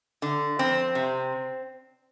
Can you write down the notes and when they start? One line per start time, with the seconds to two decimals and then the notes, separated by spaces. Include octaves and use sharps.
0.22 D3
0.59 F2 C4
0.95 C3